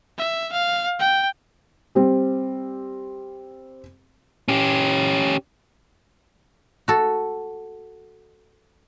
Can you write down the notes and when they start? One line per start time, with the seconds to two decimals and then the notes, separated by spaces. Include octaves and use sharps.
0.18 E5
0.52 F5
0.99 G5
1.95 G3 C4
4.48 C#4 G4
6.88 F#4 A4